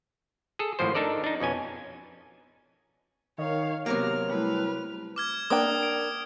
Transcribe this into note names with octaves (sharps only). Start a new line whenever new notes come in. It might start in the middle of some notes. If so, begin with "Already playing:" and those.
G#4 A4
G#1 A2 F3 C5
D4 D#4 A4 A#4 D5
D4 D#4
F2 B2 C#4 G#5
D#3 C#5 F5
C3 F#3 A#3 B3 F6
G3 A3 E4 B4
D6 F6 G#6
A#3 D4 G5 D#6
D7